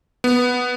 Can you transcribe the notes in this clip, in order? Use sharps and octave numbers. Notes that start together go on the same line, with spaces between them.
B3